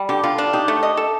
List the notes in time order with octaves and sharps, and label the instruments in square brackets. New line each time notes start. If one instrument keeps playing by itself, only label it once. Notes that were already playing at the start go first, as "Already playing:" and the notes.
Already playing: [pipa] G3
[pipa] D3 [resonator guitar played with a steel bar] G4
[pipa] D3 [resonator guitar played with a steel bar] F4
[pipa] D4
[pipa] D#4 [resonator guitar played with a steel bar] G4
[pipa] A3
D#5
A4